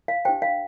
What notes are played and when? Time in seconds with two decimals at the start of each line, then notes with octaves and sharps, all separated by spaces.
0.08 F5
0.25 D4 G4 C5 G5
0.42 F5